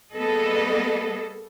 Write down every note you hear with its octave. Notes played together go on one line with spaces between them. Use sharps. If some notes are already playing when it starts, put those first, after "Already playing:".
G3 A#3 B3 G#4 A4 D#5